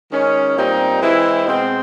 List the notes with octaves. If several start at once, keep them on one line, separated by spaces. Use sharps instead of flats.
D#3 G#3 C#4
A#2 G3 C4 D#4
E3 G#3 C4 E4
B2 G#3 C4